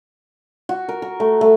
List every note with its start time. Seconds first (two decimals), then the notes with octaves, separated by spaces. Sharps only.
0.69 F#4
0.89 A#4
1.02 A#4
1.20 A3
1.41 A3